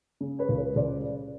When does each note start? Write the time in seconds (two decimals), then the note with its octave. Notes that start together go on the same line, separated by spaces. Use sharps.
0.21 C#3
0.39 B4 C#5
0.49 C#2
0.58 B4 C#5
0.76 C#2 C5 D5